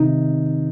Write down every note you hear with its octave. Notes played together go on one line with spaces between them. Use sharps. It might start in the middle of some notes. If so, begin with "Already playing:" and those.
Already playing: C3 D#3 D#4